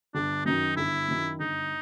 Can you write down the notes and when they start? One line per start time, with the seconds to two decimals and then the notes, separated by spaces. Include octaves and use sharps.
0.14 G1 D4
0.45 F#2 D#3 D#4
0.77 G1 E4
1.08 F#2 D#3
1.40 G1 D#4